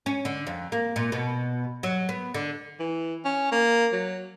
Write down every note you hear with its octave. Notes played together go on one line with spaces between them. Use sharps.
C#4
D3
F2
A#3
A#2
B2
F#3
B3
D3
E3
C#4
A#3
F#3